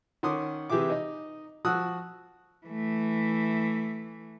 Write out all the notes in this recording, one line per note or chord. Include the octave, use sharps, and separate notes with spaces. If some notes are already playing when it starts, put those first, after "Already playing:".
D#3 C#4 F#5 C6 D6 D#6
C3 E3 G4 G#4 E5 D6
D#4 D#5
F3 F#4 D#6 E6 F#6
E3 A3